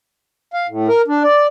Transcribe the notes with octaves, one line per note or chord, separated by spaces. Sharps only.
F5
A2
A#4
D4
D5